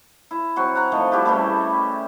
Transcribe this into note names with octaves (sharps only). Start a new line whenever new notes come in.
E4
F#3 C4 F#4 C#6
F#5 A#5
D#3 F3 A3
G3 E4 F#4 G4
C#3 E3 G3 A3